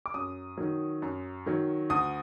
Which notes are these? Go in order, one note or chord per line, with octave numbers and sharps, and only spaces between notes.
D6
F#2 D#6
D#3 F#3
F#2
D#3 F#3
D2 D#6